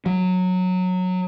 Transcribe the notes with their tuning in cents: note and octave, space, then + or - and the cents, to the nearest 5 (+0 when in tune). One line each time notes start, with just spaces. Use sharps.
F#3 -15